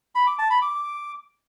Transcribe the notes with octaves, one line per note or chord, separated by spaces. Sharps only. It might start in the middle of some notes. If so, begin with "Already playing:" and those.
B5
D6
A5
B5
D6